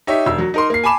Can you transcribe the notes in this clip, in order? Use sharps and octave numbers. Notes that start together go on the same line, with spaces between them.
D#4 G4 C#5 E5
E1 E6
F#3
D#4 A#4 C6
A#3 C7
G#5 A5 B5 D6 E7